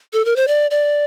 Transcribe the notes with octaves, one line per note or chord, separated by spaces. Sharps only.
A4
A#4
C5
D5
D5